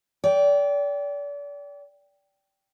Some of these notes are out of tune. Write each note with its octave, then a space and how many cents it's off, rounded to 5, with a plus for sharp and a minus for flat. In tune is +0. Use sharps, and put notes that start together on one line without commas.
D5 -35 G5 +0